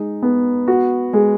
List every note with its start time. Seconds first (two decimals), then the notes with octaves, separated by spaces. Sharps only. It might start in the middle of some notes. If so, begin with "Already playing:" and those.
Already playing: G#3 D#4
0.23 B3
0.68 F#4
1.13 G#3